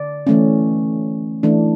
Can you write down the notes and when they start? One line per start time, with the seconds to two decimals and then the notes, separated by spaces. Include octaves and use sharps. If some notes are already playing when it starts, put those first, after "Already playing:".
Already playing: D3 D5
0.27 E3 A3 C#4
1.43 E3 A3 D4